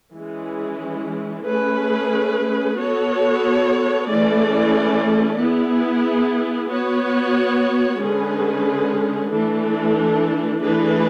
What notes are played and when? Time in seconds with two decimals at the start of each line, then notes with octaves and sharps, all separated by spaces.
0.15 E3 G#3 C#4
1.46 A3 C#4 G#4 B4
2.77 B3 F#4 A4 C#5
4.08 E3 A3 C#4 G#4 D5
5.38 B3 E4 G#4
6.69 B3 F#4 C#5
8.00 D3 G#3 C#4 G#4 B4
9.31 E3 A3 D4 A4
10.62 E3 A3 D4 G#4 B4